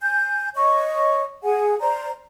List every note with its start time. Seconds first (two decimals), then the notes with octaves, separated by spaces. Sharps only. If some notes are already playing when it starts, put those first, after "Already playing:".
0.01 G#5 G6
0.55 C#5 D#5 C#6
1.43 G#4 F#5 G#5
1.80 C5 D5 A#5